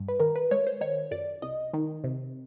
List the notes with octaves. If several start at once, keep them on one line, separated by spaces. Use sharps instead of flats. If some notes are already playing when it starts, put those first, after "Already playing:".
Already playing: G2
B4
D#3 A#4
B4
G#3 C#5
C5
D#3 C#5
F#2 D5
C2 D#5
D#3
C3